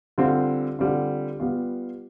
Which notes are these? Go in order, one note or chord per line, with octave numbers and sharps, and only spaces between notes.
D3 G3 C4 F4
D3 G3 C4 F4
G3 B3 F4